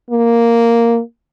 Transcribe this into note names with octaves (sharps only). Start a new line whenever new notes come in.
A#3